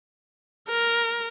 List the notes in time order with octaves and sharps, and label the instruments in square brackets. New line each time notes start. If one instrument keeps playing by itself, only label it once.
[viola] A#4